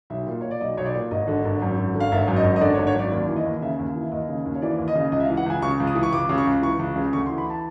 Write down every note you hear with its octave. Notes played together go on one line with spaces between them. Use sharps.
B1 E5
A#2
A#2 C#5
D5
B1 D#5
B1 C#5
D5
A#2
G#1 D#5
D3
G#1
F#2
G#1
D3
F5
G#1 E5
F#2
D#5
G#1
D#5
D3 D5
C#5
G#1
C#5
F#2 D5
D#2 D5
E3
D#5
D#2
C#3 E5
D#2
E3
E5
D#2 D#5
C#3
D#2
C#5
E3 D5
D#2
D#5
C#3
C#2 D#5
E5
F5
E3
F#5
C#2 G#5
C#3 C#6
C#2
D#6
E3
C#6
C#2 D6
C#3
C#6
C#2
E3 C#6
C#2
C#3
D2 C#6
C6
E3
B5
A5